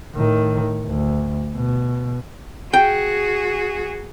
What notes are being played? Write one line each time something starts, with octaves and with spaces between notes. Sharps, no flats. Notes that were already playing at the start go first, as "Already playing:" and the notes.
A2 D#3
D2
B2
F#4 G#4 G5